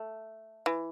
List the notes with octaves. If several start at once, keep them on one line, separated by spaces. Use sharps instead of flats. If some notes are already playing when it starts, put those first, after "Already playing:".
Already playing: A3
E3